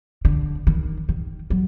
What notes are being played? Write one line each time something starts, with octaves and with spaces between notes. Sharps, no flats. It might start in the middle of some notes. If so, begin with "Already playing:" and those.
D3
D#3
D#3
F#3